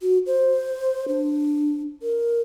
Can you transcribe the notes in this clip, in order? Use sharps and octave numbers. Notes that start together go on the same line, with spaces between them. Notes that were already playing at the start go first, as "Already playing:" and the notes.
F#4
C5
D4
A#4